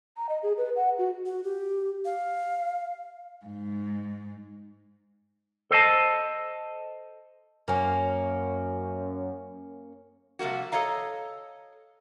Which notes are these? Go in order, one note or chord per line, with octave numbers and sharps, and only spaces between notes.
A#5
D#5
G#4
B4
F#5
F#4
F#4
G4
F5
G#2
A4 C5 D#5 A5
F#2 A#3 C#4
C3 F3 G3 A#3 F#4
A4 C5 C#5 D#5 F5 A#5